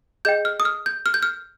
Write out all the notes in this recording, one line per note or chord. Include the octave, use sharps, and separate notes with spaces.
G#4 D#5 G5 G6
F6
D#6
F6
G6
F6
G6
F6